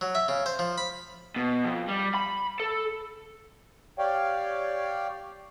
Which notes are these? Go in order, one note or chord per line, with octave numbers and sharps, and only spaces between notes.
F#3
E5
C#3
C5
F3
B5
B2
F2
G3
B5
A4
G4 C#5 D5 F5 G5